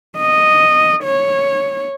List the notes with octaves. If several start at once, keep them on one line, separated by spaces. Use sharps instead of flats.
D#5
C#5